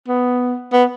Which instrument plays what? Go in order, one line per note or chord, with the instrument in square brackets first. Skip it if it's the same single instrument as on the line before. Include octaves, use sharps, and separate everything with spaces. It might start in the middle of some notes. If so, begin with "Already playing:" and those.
[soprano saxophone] B3
B3